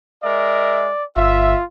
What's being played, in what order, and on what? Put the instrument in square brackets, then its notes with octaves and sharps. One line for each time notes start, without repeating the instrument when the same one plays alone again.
[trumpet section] G#3 A#4 E5 [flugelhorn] D5
[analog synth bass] G1 [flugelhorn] F4 [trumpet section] E5